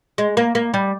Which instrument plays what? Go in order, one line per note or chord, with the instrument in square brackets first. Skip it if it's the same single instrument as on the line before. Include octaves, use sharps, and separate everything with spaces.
[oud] G#3
A#3
A#3
G3